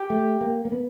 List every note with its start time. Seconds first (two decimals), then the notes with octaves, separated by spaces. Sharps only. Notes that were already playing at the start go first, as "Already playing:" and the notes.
Already playing: G4
0.10 A3
0.41 A#3
0.65 A#3
0.72 B3